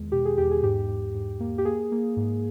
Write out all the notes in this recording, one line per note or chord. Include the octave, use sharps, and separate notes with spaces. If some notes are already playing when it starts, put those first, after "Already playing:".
Already playing: E2 D#3 G#3
B2 G4
G#4
E2 G4
G#4
G#2 G4
G#2
G#2
A#3
G4
A#3 G#4
A#3
G#2